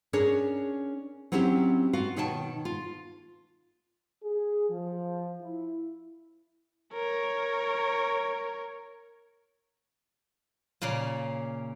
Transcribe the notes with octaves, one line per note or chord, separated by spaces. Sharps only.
C#4 D4 G#4 A#4 C#5
F#3 C4 C#4 E4 G4
F4 F#4 F5
B2 D#3 C#5 G5 A5
F4
G#4
F3
E4
A#4 C#5
A#2 C#3 A#3